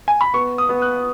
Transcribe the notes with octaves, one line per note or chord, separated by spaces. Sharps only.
G#5
B5
B3 C#6
D#6
B3
F#6